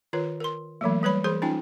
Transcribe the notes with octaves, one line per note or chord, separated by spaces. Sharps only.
D#3 F4 B4 C#5
A#4 C6
E3 F#3 A3 A#3
G3 B4 C#5 B5
E3 G#4 C5 C6
C#4 D#4 F4 G5